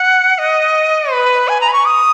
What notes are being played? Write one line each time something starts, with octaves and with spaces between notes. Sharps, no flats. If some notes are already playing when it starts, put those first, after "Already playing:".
Already playing: F#5
D#5
B4
G#5
A#5
B5
C#6
D#6